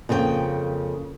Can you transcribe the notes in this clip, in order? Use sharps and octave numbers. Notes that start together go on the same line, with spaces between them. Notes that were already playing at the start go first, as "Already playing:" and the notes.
F2 C#3 A#3 F4 G5